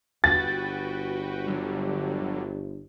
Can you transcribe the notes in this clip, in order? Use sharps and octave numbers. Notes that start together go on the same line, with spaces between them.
G1 F#4 B4 G5 A6
D3 F#3 G3